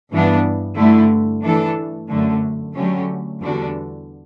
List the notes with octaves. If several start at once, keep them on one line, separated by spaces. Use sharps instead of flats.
G2 E3 B3 D4
G2 D3 A3 E4
E3 A3 D4 A4
F#2 D3 A3
D3 F#3 A3 C#4 G4
E2 D3 G3 D4 F#4